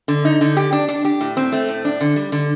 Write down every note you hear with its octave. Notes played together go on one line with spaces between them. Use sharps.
D3
D#4
D3
G4
D4
D4
G4
A2
C4
A3
A2
D4
D3
G3
D3